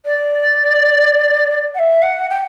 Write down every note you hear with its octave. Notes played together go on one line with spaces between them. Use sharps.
D5
F#5
E5
F#5
G5